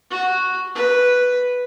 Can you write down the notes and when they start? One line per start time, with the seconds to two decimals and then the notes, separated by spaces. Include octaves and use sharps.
0.11 F#4
0.75 B4